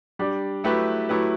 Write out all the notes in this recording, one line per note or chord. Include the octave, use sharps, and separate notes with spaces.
G3 D4 G4
F#3 A3 E4 G4 B4
F#3 A3 E4 G4 B4